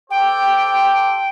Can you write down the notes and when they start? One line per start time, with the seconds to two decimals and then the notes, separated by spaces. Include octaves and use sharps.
0.11 G4 A4 C5 G5